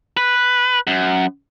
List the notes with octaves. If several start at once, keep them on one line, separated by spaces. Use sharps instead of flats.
B4
F#2